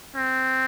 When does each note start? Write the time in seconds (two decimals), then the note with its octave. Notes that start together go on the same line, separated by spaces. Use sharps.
0.16 C4